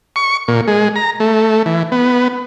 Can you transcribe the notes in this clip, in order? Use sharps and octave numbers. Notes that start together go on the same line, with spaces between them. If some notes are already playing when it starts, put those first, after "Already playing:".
C#6
A#2
G#3
A#5
A3
E3
B3